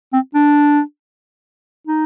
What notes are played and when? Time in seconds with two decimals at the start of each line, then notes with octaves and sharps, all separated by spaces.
0.13 C4
0.35 D4
1.87 D#4